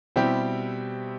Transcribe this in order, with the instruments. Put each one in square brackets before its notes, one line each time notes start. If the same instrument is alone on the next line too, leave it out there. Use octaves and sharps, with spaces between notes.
[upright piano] B2 G3 C4 E4 G4